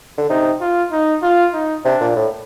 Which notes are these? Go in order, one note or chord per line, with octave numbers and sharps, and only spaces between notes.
D3
C3 D#4
F4
D#4
F4
D#4
C3 D4
A#2
A2